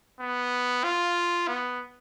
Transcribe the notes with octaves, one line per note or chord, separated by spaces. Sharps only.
B3
F4
B3